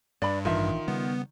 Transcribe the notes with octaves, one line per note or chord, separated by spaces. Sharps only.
G2 D5 B5
A1 D#3 E3 D4 F4 E5
C#3 G3 B3